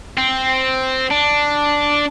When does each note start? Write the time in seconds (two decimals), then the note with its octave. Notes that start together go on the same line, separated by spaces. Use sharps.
0.18 C4
1.10 D4